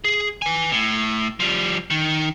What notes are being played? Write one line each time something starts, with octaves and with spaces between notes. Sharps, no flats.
G#4
B4 G#5
A2
F3 G3
D#3